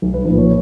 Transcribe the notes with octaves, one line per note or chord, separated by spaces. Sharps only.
B1
B4
F3 B4
A#2
C#5